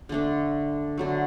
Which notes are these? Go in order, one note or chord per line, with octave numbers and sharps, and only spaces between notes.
D3 A3 D4
D3 F#3 A3